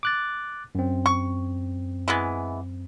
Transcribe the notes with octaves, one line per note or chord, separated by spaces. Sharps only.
D6 F#6 A6
F#2 C4
C#6
E3 G#3 B3